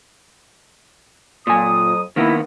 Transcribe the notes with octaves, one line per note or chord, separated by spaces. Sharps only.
F2 A#2 F#3 G#5 D#6
D#3 A#3 B3 E4